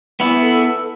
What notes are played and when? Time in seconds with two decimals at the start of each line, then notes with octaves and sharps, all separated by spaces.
0.20 B3 E4
0.41 A4